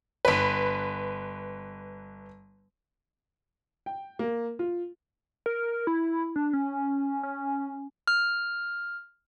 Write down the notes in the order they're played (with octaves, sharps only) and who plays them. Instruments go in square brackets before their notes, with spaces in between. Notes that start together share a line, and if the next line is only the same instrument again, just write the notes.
[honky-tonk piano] G1 B4
[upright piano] G5
A#3
F4
[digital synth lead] A#4
E4
D4
C#4
C#4
[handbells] F6